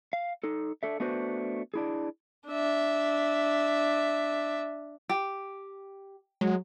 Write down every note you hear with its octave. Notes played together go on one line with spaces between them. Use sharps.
F5
D#4 A4
D4 A4 E5
A3 B3 D4 F#4 B4 C5
D4 E4 G#4
D4 E5
G4
F#3 G#3